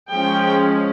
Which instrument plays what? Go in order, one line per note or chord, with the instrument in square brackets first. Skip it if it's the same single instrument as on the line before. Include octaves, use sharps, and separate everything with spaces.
[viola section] F3 G#3 C#4 G5